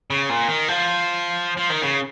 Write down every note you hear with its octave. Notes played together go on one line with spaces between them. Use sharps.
C#3
A#2
D#3
F3
F3
D#3
C#3